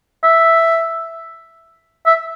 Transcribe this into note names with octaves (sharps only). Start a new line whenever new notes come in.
E5
E5